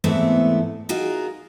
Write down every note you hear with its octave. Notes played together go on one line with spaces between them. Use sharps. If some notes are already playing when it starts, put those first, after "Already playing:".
E2 G#2 A3 B3 C4 E4
D#4 F4 F#4 G#4 A#4